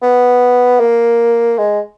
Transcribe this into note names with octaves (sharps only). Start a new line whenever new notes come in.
B3
A#3
G#3